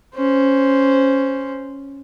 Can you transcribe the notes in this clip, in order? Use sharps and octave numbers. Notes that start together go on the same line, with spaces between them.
C#4 C5